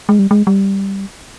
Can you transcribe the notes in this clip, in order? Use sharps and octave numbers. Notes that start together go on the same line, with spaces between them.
G#3
G3
G#3
G3